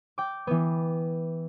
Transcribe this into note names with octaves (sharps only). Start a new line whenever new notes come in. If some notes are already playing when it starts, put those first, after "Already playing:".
G5 D6
E3 B3